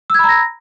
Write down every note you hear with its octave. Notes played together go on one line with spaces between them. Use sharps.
A#5 B5 E6 G#6 A#6